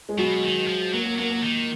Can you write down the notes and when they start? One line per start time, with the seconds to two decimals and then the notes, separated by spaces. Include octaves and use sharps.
0.09 G#3
0.18 B2 F#3
0.43 D#3
0.68 F3
0.93 F#3 A#3
1.05 A#3
1.18 F#3 A#3
1.31 A#3
1.43 D#3